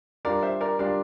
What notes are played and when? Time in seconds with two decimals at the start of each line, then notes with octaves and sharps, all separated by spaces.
0.25 G3 D4 F4 A#4 D5
0.43 C5 E5
0.61 A#4 D5
0.79 G3 D4 F4 A#4 D5